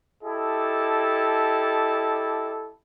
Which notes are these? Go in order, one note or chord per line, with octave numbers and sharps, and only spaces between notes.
E4 G4 A4 D#5 A5